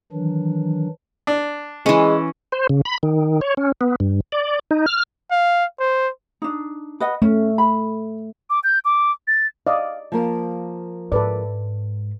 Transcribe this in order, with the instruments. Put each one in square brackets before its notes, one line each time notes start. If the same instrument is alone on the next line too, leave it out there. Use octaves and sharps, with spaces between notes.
[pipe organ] D#3 E3 F#3 D4
[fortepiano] D4
[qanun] E3 C#4 [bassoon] G#3
[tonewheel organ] C5
C#3
B5
D#3
C#5
C#4
B3
G2
D5
D#4
F6
[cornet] F5
C5
[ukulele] D4 D#4
B4 D#5 F#5
[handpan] A3 [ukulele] C#4
[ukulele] B5
[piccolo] D6
G6
D6
A6
[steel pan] D5 D#5 [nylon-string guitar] F5
[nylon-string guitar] F3 A#3 A#4
[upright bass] G#2 [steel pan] A4 B4 D5